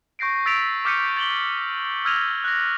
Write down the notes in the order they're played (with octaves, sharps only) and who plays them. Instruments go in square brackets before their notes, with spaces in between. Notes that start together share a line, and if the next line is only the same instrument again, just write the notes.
[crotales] C#6 G6 A#6 C7 D7
E6 A6 B6 D7 F7
D6 F6 G6 B6 C#7 D#7
A6 F#7 G7
E6 F6 G#6 A#6 D#7 F7
F#6 A#6